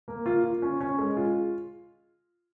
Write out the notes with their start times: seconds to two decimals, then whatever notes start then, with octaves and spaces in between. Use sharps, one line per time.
0.08 A#3
0.26 F4
0.44 F4
0.62 C#4
0.80 C#4
0.99 G#3
1.17 F4